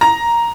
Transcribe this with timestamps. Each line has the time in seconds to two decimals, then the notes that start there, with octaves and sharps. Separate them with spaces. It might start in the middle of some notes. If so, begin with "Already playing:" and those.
0.01 A#5